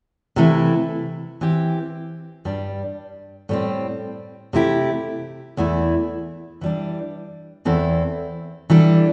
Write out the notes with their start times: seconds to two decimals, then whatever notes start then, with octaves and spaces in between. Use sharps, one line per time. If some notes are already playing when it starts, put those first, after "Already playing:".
0.36 C3 E3 A3 E4
1.41 E3 C4 G4
2.45 G2 G3 D4
3.49 A2 G3 C4
4.53 C3 A3 E4 G4
5.57 E2 E3 A3 E4
6.61 E3 G3 D4
7.65 E2 E3 C4 E4 A4
8.70 E3 G3 D4 A4